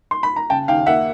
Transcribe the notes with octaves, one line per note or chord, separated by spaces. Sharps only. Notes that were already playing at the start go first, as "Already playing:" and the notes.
C6
B5
A#5
C#3 G5 A5
D#2 F5 G5
A#3 E5 F#5